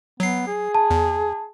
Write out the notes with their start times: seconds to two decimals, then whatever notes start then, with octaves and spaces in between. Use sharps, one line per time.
0.20 F#3 B3 C7
0.48 G#4
0.75 A5
0.90 E2